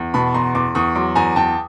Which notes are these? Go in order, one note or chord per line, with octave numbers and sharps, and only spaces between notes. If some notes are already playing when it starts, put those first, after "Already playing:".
Already playing: E2
B2 A5 B5
E2 A#5 C6
E2 C6 D6
E2 C#6 D#6
F#3 C6 D6
E2 G#5 A#5
E2 G5 A5